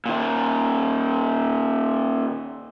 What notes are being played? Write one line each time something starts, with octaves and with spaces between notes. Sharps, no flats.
A#2 D#3